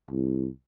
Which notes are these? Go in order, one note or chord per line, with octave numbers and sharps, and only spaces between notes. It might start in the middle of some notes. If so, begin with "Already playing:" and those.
C2